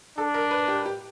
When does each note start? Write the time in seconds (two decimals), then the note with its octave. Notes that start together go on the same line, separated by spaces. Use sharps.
0.18 D4 A4
0.34 A#4
0.51 B4
0.68 G4
0.86 G4